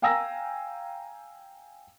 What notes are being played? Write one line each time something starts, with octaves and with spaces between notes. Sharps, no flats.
F5 G5 G#5 A#5 E6 A#6